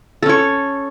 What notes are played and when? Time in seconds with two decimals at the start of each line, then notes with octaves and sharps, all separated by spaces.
0.23 A4
0.26 C#4
0.29 C#5